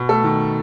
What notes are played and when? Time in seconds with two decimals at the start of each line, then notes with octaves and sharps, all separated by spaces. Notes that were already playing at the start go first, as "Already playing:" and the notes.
Already playing: B2
0.09 A3 A4
0.24 D#3